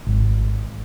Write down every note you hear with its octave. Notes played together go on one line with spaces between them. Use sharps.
G#1